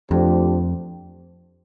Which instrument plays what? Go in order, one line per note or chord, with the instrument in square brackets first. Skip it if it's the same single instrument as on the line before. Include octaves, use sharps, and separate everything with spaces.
[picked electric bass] F2 [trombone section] F3 A3 D4 G4 C5